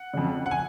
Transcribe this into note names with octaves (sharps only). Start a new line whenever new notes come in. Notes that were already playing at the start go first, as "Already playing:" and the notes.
Already playing: F#5
F2 C#3
F#5
G#5